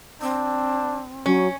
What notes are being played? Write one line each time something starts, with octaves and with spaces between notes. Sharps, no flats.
C4 D4
F#3 C#4